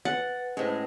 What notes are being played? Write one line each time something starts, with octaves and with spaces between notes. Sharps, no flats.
B4 F#5 G#5 A6
A2 G#3 C#4 C5